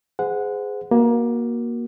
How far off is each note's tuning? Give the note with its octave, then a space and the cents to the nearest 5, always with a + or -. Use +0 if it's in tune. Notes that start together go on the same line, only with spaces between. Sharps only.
G#4 +0 C5 -35 F#5 -10
A#3 +20 F#4 +0